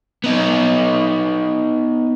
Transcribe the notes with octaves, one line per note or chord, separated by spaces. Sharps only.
B3 D#4